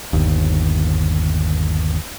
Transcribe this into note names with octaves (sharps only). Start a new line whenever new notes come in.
G1 D#2